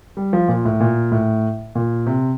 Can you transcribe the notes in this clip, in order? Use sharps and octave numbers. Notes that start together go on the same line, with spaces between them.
G3
F3
A#2
A2
A#2
A2
A#2
C3